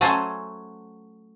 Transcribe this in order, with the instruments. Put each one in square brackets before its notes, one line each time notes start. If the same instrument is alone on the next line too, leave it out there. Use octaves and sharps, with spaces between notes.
[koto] F#3 A3 C#4 A4 C5 G#5